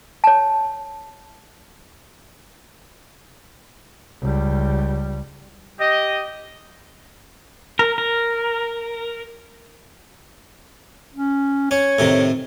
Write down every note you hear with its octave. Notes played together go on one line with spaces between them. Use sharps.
C#5 A5
C#2 G3
G4 D#5
A#4
A#4
C#4
C#4 C#5
A2 C3 D#3